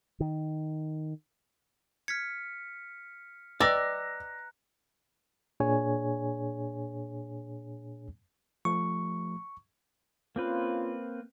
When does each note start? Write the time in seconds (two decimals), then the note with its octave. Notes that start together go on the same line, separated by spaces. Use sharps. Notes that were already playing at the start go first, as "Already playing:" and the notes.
0.20 D#3
2.08 F6 G#6 B6 C#7
3.60 B4 D5 D#5 G5 A#5 E6 F#6 A#6
5.60 A#2 D4 G#4 C#5 G#5
8.65 F3 A3 C#6
10.36 A#3 C4 C#4 F4 B4